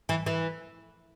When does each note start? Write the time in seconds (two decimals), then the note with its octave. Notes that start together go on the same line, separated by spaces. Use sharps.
0.09 E3
0.26 E3